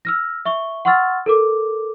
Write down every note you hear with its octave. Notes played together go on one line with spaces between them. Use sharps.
E6 F6 A#6
E5 C#6 G7
F#5 C6 C#6 E6 F6 A6
A4 A#4 D6